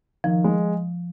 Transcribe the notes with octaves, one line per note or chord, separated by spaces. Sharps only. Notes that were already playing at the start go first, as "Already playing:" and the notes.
D#3 F3
G#3